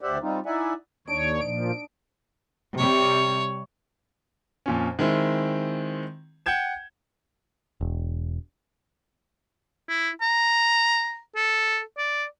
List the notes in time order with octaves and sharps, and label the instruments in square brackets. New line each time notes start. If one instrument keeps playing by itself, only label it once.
[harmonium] D2 G4 C5 D5 E5 F#5
G3 C4 D#4 F4
D#4 E4 D5 E5 F#5 G#5
[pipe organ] D#2 C#5 [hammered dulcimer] D4 D#4 D#5 [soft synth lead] D7
[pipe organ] A#2 F3 [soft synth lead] D7
[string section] C3 G3 [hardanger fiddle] C#5
[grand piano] F2 A#2 C#4
D#3 G#3 C4 E4
F#5 G5 G6 G#6 E7
[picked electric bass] E1
[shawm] E4
A#5
A4
D5